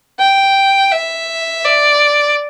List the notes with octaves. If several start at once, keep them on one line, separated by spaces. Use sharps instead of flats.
G5
E5
D5